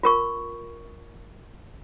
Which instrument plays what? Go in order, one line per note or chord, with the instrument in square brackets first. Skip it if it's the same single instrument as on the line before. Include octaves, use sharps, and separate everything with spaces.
[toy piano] F4 A#4 C#6